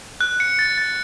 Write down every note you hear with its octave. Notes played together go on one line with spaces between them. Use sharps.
F#6
C#7
A6
A6